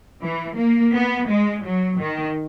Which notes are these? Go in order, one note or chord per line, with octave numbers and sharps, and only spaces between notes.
E3
A#3
B3
G#3
F#3
D#3